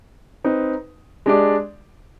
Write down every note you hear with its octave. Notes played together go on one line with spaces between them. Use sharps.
C4 D#4 B4
G#3 D4 G4 D5